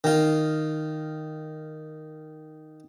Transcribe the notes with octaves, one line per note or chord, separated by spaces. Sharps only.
D#3 F4